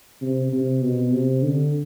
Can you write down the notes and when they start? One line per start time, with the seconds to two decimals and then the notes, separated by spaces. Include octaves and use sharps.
0.22 C3
0.52 C3
0.82 B2
1.12 C3
1.43 D3